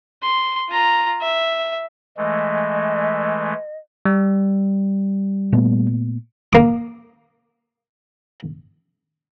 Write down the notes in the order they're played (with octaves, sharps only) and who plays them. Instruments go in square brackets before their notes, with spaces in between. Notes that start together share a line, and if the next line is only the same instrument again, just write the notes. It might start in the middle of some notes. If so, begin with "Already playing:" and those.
[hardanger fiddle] C6
F4 A#5
E5
[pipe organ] E3 G#3 A3 [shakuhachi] D#5
[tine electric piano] G3
[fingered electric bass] A#2 A3 B3
[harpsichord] A#3 D6